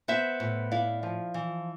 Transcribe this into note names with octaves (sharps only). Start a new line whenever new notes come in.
B3 C5 E5
A2
E4 D5 F5
F3
E3